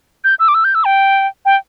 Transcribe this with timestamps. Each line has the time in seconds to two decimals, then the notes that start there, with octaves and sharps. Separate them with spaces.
0.24 G6
0.39 E6
0.48 D6
0.54 E6
0.64 G6
0.75 E6
0.85 G5
1.45 G5